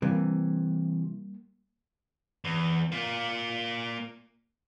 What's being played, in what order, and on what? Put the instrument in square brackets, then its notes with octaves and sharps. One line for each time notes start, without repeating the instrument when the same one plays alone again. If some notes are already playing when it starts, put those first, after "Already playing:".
[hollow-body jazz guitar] C3 E3 [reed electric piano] G3 A#3
[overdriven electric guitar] E2
A#3 F4